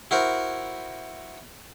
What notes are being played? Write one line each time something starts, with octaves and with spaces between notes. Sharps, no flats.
E4 F#4 A#4 C5